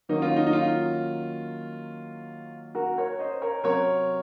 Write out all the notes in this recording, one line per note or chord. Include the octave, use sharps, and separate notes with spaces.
D#3 F#3 A#3 C#4 D#4
F4
D#4
D#4
F4
F#4 A#4
A#4 C#5
C5 D#5
A#4 C#5
C3 F#3 C4 A#4 C#5